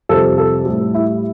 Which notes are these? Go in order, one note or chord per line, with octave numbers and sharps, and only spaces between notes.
F2 C3 G3 A4
A4
A2 G3
E4